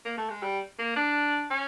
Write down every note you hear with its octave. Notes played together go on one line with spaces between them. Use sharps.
A#3
A3
G#3
G3
A#3
D4
C#4